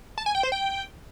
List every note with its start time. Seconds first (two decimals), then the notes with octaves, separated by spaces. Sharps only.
0.18 A5
0.26 G#5
0.35 G5
0.43 C5
0.52 G5